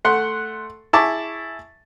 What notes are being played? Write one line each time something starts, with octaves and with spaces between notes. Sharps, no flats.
A3 F#5 C6
E4 G#4 A5 C#6 D6